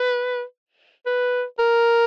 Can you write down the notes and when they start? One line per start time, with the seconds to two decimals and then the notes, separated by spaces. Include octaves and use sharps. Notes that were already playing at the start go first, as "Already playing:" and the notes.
Already playing: B4
1.06 B4
1.59 A#4